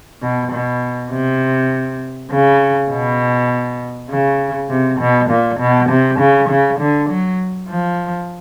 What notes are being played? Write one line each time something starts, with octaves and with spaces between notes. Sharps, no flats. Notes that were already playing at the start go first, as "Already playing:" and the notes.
B2
B2
C3
C#3
B2
C#3
C3
B2
A#2
B2
C3
C#3
C#3
D3
F#3
F3